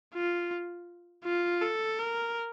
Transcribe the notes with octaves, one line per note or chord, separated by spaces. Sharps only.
F4
F4
A4
A#4